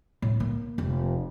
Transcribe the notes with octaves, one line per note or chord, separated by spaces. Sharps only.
A2
A#3
F1